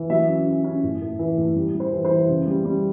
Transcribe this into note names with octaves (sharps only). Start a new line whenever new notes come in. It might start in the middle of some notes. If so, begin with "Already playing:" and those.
Already playing: E3
F#3 E5
C#4
C#4
C#4
A2
A2
E3
A2
G3
G3
C5
E3
C5
E3
C#3
G3
G3